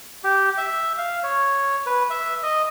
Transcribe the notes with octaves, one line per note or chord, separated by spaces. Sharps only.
G4
E5
F5
C#5
B4
E5
D#5